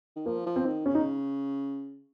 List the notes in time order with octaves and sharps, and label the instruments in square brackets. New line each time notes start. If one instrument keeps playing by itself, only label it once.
[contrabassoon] D#3
[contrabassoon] F3 [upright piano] A#3
[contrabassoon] F3
[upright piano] C4
[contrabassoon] D#3
[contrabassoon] C#3 [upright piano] C#4
[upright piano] D#4